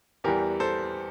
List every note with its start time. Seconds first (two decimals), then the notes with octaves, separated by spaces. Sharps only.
0.24 E2 E3 G3 G4 A#4
0.60 A4 C5